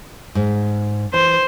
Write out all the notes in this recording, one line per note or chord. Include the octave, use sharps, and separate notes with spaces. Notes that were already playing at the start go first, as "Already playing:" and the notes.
G#2
E3 C5